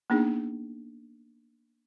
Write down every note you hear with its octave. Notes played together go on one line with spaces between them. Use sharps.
A#3 B3 D4 D#4 G#4